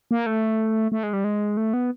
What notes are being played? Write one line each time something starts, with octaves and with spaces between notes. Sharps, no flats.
A#3
A3
A3
G#3
G3
G#3
A3
B3